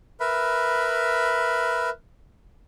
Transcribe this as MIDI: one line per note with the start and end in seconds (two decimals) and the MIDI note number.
0.20 1.90 70
0.20 1.90 71
0.20 1.90 76
0.20 1.90 83